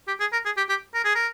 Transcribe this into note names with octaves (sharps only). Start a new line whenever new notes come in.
G4
G#4
A#4
G#4
G4
G4
A#4
G#4
A#4